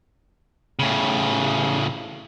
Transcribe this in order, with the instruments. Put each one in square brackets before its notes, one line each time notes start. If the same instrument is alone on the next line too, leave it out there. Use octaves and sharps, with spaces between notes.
[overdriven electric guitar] A2 C#3